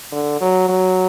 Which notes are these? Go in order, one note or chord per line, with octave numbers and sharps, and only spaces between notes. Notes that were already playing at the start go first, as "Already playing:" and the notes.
D3
F#3
F#3